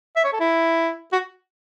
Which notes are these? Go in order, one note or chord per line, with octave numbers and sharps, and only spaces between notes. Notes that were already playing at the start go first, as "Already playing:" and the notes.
E5
C#5
A4
E4
F#4